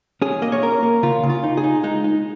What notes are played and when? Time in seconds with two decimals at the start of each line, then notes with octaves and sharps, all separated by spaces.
0.22 C#4 G#4
0.42 A#3 D#5
0.52 C#5
0.62 C#4 A#4
0.83 A#3
1.03 C#3 F4
1.23 C#3
1.29 F4
1.43 D#4
1.57 G#4
1.64 D#4
1.83 G#3 D#4
2.04 D#4